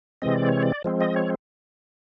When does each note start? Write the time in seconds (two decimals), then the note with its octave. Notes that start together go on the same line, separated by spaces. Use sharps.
0.22 C3 E3 G#3 C4 D#5
0.35 D5
0.49 C#5
0.62 D5
0.84 F3 G#3 C4
1.01 D#5
1.16 C#5